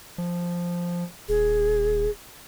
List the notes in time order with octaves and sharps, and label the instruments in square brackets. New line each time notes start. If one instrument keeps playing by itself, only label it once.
[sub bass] F3
[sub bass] D#1 [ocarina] G#4